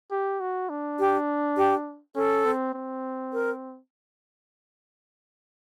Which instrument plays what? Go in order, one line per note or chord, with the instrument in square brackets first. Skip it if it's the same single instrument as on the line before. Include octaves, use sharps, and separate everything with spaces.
[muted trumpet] G4
F#4
D4
[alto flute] G4
G4
[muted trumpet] C#4 [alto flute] A4
[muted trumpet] C4
C4
[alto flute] A#4